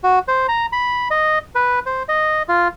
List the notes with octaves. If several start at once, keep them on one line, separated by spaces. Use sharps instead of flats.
F#4
C5
A#5
B5
D#5
B4
C5
D#5
F4